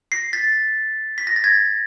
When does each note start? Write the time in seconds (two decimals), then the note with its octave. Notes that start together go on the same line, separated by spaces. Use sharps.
0.12 A#6 C7
0.33 A6 B6
1.18 B6
1.27 A#6
1.36 A6
1.44 G#6 A#6